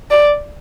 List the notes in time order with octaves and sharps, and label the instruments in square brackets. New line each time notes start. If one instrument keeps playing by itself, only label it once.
[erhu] D5